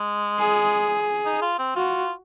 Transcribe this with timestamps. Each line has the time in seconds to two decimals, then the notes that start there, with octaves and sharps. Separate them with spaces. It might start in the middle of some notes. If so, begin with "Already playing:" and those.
Already playing: G#3
0.39 G#4
1.25 D#4
1.42 F4
1.59 C4
1.76 F4 F#4